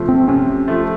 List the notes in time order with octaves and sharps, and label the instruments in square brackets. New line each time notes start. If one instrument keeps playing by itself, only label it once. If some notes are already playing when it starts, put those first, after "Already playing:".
Already playing: [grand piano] C3 F3 A3
[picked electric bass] C4
[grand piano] C3 [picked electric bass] C#4
[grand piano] F3 A3